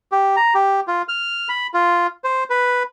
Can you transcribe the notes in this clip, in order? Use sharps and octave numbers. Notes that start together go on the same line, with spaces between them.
G4
A#5
G4
F4
F6
B5
F4
C5
B4